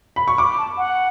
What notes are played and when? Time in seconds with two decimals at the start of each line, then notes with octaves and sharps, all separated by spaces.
0.16 B5
0.28 C#6
0.38 B5 D6
0.58 A5
0.78 F#5